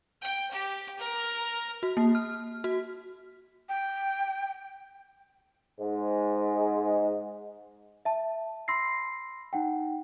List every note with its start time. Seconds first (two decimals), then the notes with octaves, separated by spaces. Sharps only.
0.22 G5
0.52 G4
0.99 A#4
1.83 F#4
1.97 A#3
2.15 F6
2.64 F#4
3.69 G5
5.80 G#2 G#3
8.05 E5 A5
8.68 B5 C6 E6 A#6 C7
9.53 D#4 F#5 G5